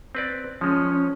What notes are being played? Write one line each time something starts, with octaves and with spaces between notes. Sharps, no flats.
C4 B4 D5
F3 G#3 C#4